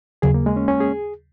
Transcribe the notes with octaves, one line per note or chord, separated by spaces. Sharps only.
D#2 C#3 F#3 G#4
A#3
G#3
C#4
C#4
G#4